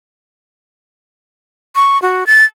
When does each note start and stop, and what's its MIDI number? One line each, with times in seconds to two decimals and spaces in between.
1.75 2.00 85
2.02 2.27 66
2.27 2.44 93